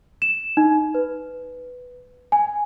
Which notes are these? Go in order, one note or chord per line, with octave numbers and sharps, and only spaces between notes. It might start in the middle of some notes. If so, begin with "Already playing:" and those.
E7
D#4
B4
G#5